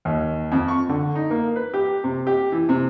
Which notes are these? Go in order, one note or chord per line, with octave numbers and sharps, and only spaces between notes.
D#2
F2
C#6
D3
D#4
A#3
B4
G4
C3
G4
E3
C3